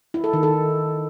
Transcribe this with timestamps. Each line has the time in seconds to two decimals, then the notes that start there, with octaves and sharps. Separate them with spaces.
0.14 E4
0.24 A4
0.33 D#3
0.43 A4